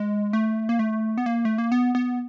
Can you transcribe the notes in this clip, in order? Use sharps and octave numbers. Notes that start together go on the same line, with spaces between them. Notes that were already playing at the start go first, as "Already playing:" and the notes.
Already playing: G#3
A3
A#3
A3
B3
A#3
A3
A#3
B3
B3